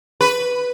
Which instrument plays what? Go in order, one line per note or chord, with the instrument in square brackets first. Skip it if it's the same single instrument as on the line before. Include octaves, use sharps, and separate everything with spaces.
[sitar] B4